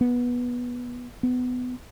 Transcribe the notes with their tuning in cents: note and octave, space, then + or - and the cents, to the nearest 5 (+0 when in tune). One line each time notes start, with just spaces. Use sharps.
B3 -15
B3 +20